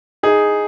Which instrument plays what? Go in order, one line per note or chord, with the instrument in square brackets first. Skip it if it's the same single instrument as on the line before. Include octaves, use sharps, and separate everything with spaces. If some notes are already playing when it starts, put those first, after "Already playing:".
[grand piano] D#4 G#4